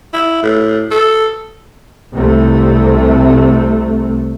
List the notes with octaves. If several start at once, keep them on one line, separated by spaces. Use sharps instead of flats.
E4
A2
A4
C2 C3 A3